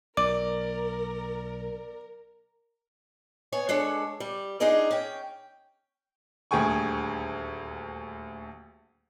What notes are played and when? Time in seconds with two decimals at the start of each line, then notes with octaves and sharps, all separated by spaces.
0.17 B1 A#4 D5 D6
3.52 B3 C#5 G#5
3.69 G#3 D4 A4 C#5
4.20 G3
4.60 D4 D#4 F4 G#4 D5 D#5
4.91 C#4 G5
6.51 D#1 D2 G#4 G5 G#5 C#6